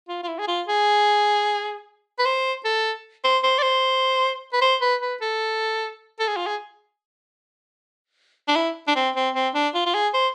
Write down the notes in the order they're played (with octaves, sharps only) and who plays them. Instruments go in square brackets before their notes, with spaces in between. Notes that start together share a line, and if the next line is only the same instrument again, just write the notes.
[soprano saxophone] F4
F4
E4
G#4
F4
G#4
B4
C5
A4
C5
C5
D5
C5
B4
C5
B4
B4
A4
A4
G#4
F4
G#4
D4
E4
D4
C4
C4
C4
D4
F4
F4
G#4
C5